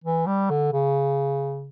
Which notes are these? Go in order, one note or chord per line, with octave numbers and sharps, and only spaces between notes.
E3
G3
D3
C#3